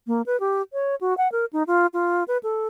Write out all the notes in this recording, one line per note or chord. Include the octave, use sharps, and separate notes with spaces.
A#3
B4
G4
C#5
F#4
F#5
A#4
D#4
F4
F4
B4
A4